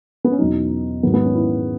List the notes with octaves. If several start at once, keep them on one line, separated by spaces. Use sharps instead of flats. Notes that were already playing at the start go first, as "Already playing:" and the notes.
B3
C#4
E2 B2 F#3 D#4
G#2 D#3 F#3 B3
B3
C#4
E4